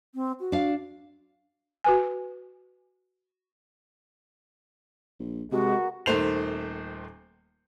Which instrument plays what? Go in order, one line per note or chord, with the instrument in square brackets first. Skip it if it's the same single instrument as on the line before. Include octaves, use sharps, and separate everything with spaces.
[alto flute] C4
F#4
[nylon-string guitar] D4 F5
[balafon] F#4 B4 G#5
[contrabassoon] A#1
[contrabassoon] C3 [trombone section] G#3 [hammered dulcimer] B3 A#4 [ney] F#4
[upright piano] D#1 D#3 A3 C5 C7 F7